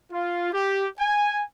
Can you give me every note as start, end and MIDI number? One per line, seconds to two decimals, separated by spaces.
0.12 0.49 65
0.53 0.85 67
0.99 1.41 80